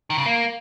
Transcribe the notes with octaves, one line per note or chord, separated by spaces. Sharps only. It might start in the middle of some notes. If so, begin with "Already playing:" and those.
D#3
C#3
A#3